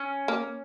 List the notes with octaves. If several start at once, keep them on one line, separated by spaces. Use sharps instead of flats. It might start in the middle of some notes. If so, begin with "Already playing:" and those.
Already playing: C#4
A#3